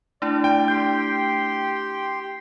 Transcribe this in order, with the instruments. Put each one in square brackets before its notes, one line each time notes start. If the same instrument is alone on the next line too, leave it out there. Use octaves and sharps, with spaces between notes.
[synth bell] A3 D4 E4 [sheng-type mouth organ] D5
[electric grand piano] G5
[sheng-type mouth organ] G4 G5 C6 [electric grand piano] G6